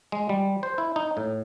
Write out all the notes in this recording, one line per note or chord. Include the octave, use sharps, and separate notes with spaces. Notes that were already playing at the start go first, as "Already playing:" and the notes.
G#3
G3
C5
E4
D#4
A2